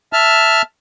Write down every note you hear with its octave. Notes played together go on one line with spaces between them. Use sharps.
E5 A5 F6